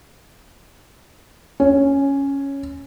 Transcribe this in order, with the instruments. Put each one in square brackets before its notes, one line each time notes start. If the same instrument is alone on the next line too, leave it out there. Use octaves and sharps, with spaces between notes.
[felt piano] C#4